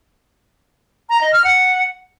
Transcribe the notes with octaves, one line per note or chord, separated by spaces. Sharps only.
A#5
D#5
F6
F#5